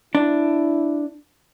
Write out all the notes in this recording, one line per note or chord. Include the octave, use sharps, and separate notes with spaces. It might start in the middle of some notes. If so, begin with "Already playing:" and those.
D4 E4